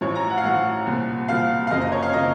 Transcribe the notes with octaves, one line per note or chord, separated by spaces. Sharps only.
A1 A2 F3 C#5
A#5
F#5
F5
A1 A2 F3 F#5
C2 A#2 F3
C2 A#2 F3 F5
F5
F#1 F2 C#3 F3 A#3 D#5
D#5
C#5
F5
C#3 F3 A#3 D#5